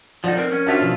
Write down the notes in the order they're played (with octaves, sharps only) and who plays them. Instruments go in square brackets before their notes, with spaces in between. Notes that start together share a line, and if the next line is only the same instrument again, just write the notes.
[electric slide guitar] F3 D#4 [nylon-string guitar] B3 A4 F#5 [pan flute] D5
[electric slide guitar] C4 [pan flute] A#4
[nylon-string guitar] F3 [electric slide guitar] C#4
[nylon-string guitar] D4 F#4 C5 [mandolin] F4 E5 A5
[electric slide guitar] B2 D#3 F3